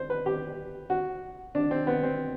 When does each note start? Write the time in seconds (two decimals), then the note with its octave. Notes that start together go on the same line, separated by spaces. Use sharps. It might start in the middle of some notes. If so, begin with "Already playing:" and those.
Already playing: C5
0.10 B4
0.26 G4
0.90 F#4
1.55 D4
1.71 C4
1.87 B3
2.03 C4